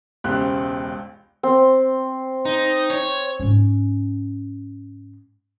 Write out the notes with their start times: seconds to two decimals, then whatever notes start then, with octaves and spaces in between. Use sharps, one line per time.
0.24 E1 C#2 G4 C5 F#6
1.43 C4
2.45 D#4
2.90 C#5
3.40 G#2 C#4